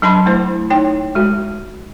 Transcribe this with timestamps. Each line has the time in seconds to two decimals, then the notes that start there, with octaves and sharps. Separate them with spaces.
0.02 F#3 D4 A5 B5 C6
0.26 A3 E4 C5
0.70 D#4 C#5 G5
1.15 G#3 F#4